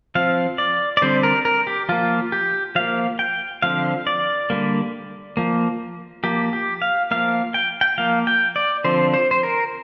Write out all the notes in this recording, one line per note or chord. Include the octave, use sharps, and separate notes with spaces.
F3 C4 F5
D5
D5
D3 G3 C4 C5
A#4
A#4
G4
F3 A#3 F4
G4
F3 A#3 F5
G5
D3 F3 C4 F5
D5
D3 G3 A#3
F3 A#3
F3 A#3 G4
G4
F5
F3 A#3 F5
G5
G5
F3 A#3 F5
G5
D5
D3 F3 C4 C5
C5
C5
A#4